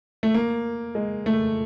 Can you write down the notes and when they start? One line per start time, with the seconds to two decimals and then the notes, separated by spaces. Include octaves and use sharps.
0.23 A3
0.34 A#3
0.95 G#3
1.26 A3